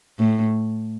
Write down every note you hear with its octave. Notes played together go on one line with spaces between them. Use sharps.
A2